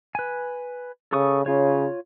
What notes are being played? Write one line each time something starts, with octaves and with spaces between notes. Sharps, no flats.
B4 G#5
C#3 A4 C#6 D#6
C#3 F4 C#5